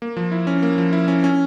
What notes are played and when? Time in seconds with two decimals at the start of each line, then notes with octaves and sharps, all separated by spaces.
0.02 A#3
0.17 F3
0.32 E4
0.47 C#4
0.63 A#3
0.78 F3
0.93 E4
1.08 C#4
1.24 C#4